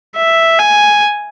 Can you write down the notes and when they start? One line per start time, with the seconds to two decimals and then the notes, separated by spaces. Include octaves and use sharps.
0.16 E5
0.59 G#5